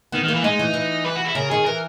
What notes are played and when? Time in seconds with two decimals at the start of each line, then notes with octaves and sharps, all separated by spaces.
0.12 D#3 B3
0.23 D#3
0.28 A#3
0.34 E3
0.43 G#3 D#4
0.59 E3
0.74 E3
1.05 B4
1.16 F#4
1.25 E4
1.35 C#3 A#4
1.50 D#3 G#4
1.65 E3 A#4